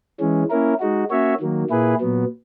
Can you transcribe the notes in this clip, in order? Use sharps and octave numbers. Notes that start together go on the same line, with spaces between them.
E3 G#3 C#4
A#3 C#4 E4 A#4
G#3 D#4 F#4
A#3 C#4 F#4 C#5 E5
D#3 F#3 A#3
A#2 A#3 E4 G#4 B4
A#2 F#3 B3